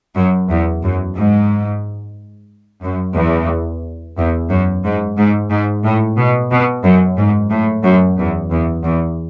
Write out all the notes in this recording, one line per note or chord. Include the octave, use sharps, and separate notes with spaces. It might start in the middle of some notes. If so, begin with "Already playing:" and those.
F#2
E2
F#2
G#2
F#2
E2
E2
F#2
G#2
G#2
G#2
A2
B2
B2
F#2
G#2
A2
F#2
E2
E2
E2